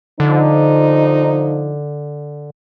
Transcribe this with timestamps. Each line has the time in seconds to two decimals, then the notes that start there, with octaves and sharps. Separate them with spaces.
0.20 D3 F3 D#4